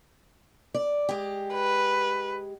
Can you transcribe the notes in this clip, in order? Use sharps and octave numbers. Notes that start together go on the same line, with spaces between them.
D5
G#3 G4
B4